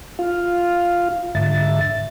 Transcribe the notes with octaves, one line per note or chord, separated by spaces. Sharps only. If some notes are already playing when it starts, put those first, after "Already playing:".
F4 F5
G#2 D3 E5 A6